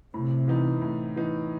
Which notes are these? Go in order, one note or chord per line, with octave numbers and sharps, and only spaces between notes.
A2 C3
E3 B3 D#4
A2
E3 B3 D#4